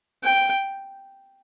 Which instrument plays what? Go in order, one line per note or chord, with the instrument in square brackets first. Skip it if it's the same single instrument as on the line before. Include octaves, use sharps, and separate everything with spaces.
[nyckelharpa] G5